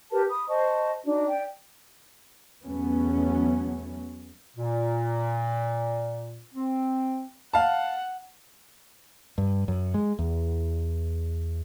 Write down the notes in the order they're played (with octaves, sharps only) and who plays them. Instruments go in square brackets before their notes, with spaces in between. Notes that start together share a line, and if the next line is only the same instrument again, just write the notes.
[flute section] G4 A#4 B4 A5
B5 D#6
C5 D#5 A5 C#6
D4 D#4 F#4
D5 G5
[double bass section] E2 F#3 A3 B3 C#4
[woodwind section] A#2
C4
[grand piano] F5 A5 [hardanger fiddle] F#5
[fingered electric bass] G2
F#2
G#3
E2